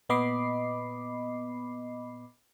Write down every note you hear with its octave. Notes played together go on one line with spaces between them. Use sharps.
A#2 B3 D#5 B5 D6 C7